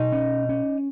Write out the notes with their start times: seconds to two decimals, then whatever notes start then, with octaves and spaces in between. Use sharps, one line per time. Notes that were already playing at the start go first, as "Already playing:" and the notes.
Already playing: B2 D#4
0.12 C#4
0.49 C#4